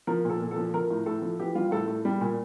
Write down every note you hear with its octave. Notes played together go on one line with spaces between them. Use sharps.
F3 A#4
A#2 A4
A#2
A4
F3
F3 A#4
A2
A2 A4
F3
E3 G4
G3 F4
A2 A4
A2
G3
A#2